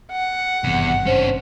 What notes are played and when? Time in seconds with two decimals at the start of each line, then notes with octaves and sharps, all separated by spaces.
0.12 F#5
0.64 G#1 E2 G2 C3
1.06 C#4 D4 C5